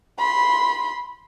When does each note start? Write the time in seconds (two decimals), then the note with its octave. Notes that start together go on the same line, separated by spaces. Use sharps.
0.19 B5 C6